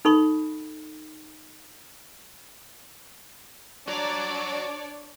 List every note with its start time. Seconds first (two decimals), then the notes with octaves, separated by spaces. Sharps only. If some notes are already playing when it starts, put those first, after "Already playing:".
0.05 D#4 A4 B5 C#6
3.88 D4 F#4 C#5 D5 A#5